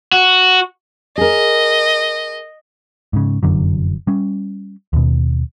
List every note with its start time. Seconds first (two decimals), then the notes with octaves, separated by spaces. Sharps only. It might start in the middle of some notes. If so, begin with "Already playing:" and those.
0.12 F#4
1.18 G#4 A#4 D#5
3.13 G#2 C#3
3.43 F1 F#2 D3 F#3
4.07 G3 C#4
4.93 D#2 B2